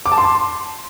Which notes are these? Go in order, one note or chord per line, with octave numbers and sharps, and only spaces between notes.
D6
A5
C6